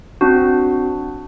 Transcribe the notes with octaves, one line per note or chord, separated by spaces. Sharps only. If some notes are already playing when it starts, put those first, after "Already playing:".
C4 D4 F#4